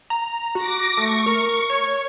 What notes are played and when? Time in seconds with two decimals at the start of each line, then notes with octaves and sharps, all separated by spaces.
0.10 A#5
0.55 F#4 D6 A#6
0.97 A3 C#6
1.26 A#4
1.70 C#5